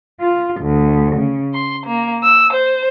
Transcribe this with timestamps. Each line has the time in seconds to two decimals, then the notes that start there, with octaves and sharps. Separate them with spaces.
0.19 F4
0.60 D2
1.16 C#3
1.54 C6
1.86 A#3
2.24 E6
2.53 C5